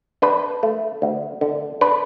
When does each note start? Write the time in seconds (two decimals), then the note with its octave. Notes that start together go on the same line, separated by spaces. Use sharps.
0.22 D4 B4
0.63 A3
1.02 D2
1.41 D3
1.81 D4 B4